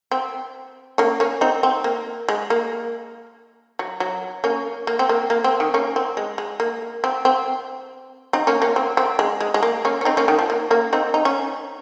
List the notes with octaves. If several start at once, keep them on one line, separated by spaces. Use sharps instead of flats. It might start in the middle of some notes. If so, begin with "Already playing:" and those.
C4
A#3 C#4
A#3 C#4
C4 D#4
C4
A#3
G#3
A#3
F#3
F#3
A#3 C#4
A#3
C4
A#3
A#3
C4
D#3
A#3 C#4
C4
G#3
G#3
A#3
C4
C4
C4 D#4
A#3 C#4
A#3 C#4
C4
C4
G#3
G#3
G#3
A#3
A#3 C#4
C#4
C4 D#4
A#3 C#4
D#3
F3
A#3
A#3 C#4
C4 D#4
D#4
C#4